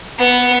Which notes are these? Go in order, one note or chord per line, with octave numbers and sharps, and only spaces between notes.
B3